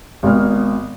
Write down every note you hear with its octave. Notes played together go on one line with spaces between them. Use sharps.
G#1 B2 F6